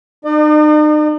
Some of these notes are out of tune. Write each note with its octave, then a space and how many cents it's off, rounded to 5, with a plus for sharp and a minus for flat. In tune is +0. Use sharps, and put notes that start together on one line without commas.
D#4 -40 D5 +45